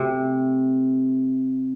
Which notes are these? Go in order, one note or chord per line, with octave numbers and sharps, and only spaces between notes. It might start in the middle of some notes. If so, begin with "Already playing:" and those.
Already playing: C3 A3